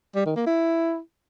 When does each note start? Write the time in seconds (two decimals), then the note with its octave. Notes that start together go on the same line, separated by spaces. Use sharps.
0.15 G3
0.26 D#3
0.36 A#3
0.46 E4